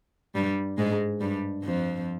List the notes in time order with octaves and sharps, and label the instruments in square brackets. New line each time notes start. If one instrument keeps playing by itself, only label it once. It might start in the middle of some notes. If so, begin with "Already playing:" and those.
[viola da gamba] G2 G3
G#2 G#3
G2 G3
F2 F3